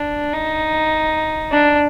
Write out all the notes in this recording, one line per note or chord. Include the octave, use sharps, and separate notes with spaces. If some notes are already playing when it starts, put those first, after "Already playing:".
Already playing: D4
D#4
D4